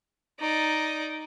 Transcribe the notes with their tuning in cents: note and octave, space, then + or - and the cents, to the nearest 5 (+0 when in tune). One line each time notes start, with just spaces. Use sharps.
D#4 +0 D5 -5